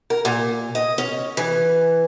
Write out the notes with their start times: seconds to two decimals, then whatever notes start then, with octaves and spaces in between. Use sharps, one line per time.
0.10 A#4
0.25 A#2
0.75 D#5
0.98 C#4
1.37 E3